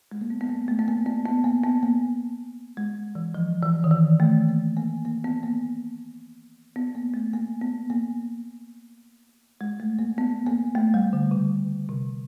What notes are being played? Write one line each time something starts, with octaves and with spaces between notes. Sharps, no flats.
G#3
A#3
B3
B3
A#3
A3
B3
A#3
B3
B3
A#3
B3
A#3
G#3
E3
F3
E3
D#3
E3
A3
A#3
A#3
A#3
B3
A#3
B3
A#3
A3
A#3
B3
A#3
G#3
A3
A#3
B3
A#3
A3
G3
D3
C#3
C3